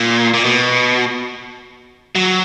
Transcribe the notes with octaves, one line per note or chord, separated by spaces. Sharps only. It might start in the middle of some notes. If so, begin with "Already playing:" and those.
Already playing: A#2
A#2
B2
F#3